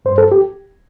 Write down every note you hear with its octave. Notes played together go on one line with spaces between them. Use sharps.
G2 C5
A4
G4